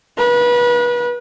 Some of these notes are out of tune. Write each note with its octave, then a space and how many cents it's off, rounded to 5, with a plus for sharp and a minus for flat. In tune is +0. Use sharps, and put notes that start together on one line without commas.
B4 -30